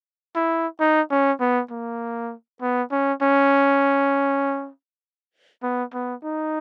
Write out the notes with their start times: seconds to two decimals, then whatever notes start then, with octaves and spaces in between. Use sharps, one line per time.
0.35 E4
0.80 D#4
1.11 C#4
1.40 B3
1.71 A#3
2.61 B3
2.92 C#4
3.22 C#4
5.63 B3
5.94 B3
6.24 D#4